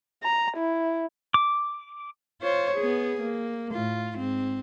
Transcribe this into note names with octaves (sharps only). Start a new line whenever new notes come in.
A#5
E4
D6
F4 C5 C#5
B3 G#4
A#3
A2 F4
G#2 C4